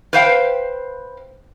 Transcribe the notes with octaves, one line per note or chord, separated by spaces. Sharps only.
B4 C5 F5 G5